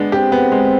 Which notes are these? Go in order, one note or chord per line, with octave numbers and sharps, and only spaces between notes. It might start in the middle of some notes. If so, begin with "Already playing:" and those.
Already playing: G#3 B3 D4
C4 G4
B3
G#3